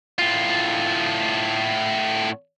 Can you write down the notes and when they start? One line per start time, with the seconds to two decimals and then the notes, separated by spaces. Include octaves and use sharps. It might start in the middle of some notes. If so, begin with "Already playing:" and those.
0.19 A2 F4